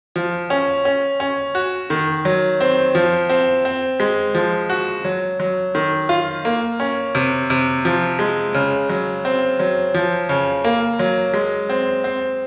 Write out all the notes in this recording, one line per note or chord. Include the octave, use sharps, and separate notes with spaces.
F3
C#4
C#4
C#4
F#4
D#3
F#3
C4
F3
C4
C4
G#3
F3
F#4
F#3
F#3
D#3
F4
A#3
C#4
C3
C3
F3
G#3
C#3
F#3
C4
F#3
F3
C#3
A#3
F#3
G#3
C4
C4